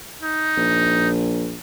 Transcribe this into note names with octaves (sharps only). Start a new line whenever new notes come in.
D#4
A#1